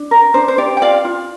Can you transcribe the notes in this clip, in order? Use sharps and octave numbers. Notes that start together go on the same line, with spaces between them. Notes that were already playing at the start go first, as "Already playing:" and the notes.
Already playing: D4
A#4
D4 C5
C5
G4 D5
G5
F4 D5 F5
F4